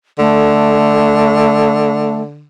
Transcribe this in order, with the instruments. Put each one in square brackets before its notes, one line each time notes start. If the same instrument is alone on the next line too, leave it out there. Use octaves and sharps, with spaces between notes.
[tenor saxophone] D3 [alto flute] A3